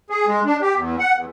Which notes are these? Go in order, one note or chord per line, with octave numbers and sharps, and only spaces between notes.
G#4
G#3
D4
G4
E2
F#5
E2